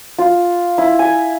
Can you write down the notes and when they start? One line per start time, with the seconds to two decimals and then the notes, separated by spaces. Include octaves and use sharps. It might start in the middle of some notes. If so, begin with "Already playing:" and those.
0.19 F4
0.78 E4
0.99 G#5